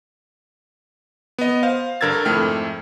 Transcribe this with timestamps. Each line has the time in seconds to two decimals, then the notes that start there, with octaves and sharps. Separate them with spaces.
1.39 B3 D#5
1.63 C5 F5
2.01 G2 D3 A#4 E6 G#6 A6
2.25 F2 G#2 A3 E4 G5 F6